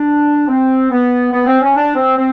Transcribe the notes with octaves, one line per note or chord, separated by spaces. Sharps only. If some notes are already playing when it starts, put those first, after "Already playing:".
Already playing: D4
C4
B3
B3
C4
C#4
D4
C4
C4